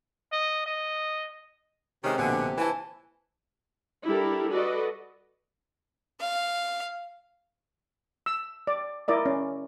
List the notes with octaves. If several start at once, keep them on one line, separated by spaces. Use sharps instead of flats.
D#5
D#5
C3 D#3 G#3 C#4 G4
A#1 B2 D3 G#5
E3 C5 G#5 A5
G3 D4 E4 G4 A4 A#4
F#4 A4 B4 D5 D#5
F5
E6
D5
E4 A#4 D5 D#5
C#4